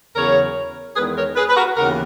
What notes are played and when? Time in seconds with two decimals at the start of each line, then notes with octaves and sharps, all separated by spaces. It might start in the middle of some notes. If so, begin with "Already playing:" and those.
0.15 E2 C#3 F#3 A#4 C#5
0.96 E2 D#3 G#3 B3 G#4 B4
1.16 A#4 C#5
1.36 G#4 B4
1.49 B4
1.56 F#4 A#4
1.77 D#2 C#3 E3 B3 F#4 A#4